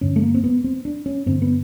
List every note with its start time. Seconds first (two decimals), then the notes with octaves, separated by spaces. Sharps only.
0.01 G2 D3 C#4
0.16 A3
0.23 A#3
0.34 C4
0.44 B3
0.64 C4
0.85 D4
1.06 C#4
1.26 G2 D3 C4
1.42 B3